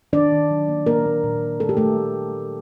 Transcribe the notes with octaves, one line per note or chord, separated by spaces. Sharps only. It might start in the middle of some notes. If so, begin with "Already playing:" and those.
D#3 D4 D5
D#3
F#3
A#3
A#2 A#3 A#4
A#3
A#2
A#2
A3 A4
G4
A3 A4
A3
A3
A3